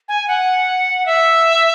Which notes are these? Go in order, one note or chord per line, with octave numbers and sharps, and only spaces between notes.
G#5
F#5
E5